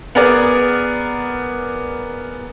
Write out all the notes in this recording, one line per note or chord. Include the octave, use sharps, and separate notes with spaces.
B3 G#4 A#4 D5